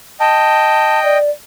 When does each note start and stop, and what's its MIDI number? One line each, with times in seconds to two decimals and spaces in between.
0.20 1.18 75
0.20 1.18 79
0.20 1.00 81
1.04 1.30 74